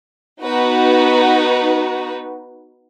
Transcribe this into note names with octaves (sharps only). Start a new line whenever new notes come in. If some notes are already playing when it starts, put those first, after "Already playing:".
B3 D#4 F#4 B4